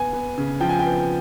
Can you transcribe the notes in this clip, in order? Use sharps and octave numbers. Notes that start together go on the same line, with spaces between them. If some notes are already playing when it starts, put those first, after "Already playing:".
Already playing: B3 G#5
B3
C#3
F3 G5
G#5
B3 G5